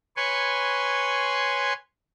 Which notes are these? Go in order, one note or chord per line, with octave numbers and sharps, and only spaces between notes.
B4 C#5 G#5 C6 C#6